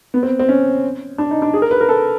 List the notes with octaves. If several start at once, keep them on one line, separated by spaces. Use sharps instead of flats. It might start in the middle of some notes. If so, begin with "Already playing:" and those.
B3
C4
C4
C#4
D4
D#4
D4
G#4
A#4
B4
A#4
A4